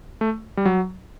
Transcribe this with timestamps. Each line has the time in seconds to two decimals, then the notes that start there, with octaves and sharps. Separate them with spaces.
0.21 A3
0.57 G3
0.65 F#3